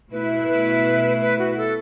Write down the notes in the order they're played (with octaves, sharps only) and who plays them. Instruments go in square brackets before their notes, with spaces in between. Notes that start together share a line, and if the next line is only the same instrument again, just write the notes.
[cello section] B2 A3 E4 [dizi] B4
[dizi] B4
B4
F#4
A4